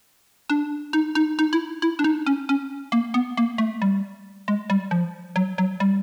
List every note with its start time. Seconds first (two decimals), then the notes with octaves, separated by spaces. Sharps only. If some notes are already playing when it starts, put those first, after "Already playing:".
0.50 D4
0.93 D#4
1.15 D#4
1.39 D#4
1.53 E4
1.82 E4
1.99 D4
2.04 D#4
2.26 C#4
2.49 C#4
2.92 A#3
3.14 B3
3.37 A#3
3.58 A3
3.82 G3
4.48 G#3
4.70 G3
4.91 F3
5.36 F#3
5.58 F#3
5.80 G3